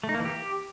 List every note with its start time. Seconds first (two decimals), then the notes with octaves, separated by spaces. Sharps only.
0.04 A3
0.09 D#4
0.14 A#3
0.20 E3
0.25 G4